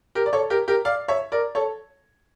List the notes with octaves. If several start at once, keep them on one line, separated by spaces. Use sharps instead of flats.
G4 A#4
D5
A4 C#5
G4 A#4
G4 A#4
D5 F5
C#5 E5
A#4 D5
A4 C#5